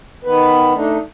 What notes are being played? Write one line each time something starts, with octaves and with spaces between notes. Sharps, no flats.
D#3 B3 B4
A3 D4 D#4